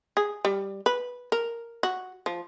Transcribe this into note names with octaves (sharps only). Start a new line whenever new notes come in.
G#4
G3
B4
A#4
F#4
F3